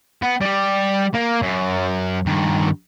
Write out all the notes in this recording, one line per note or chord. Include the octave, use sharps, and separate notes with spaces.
B3
G3 G4
A#3
F#2
G2 D#3